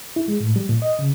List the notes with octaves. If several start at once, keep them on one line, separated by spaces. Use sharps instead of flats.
E4
G#3
A2
G3
A#2
D#5
C#3